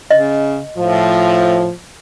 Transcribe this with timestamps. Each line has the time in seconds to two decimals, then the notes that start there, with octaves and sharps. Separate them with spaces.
0.11 C#3 D#5
0.78 A2 F3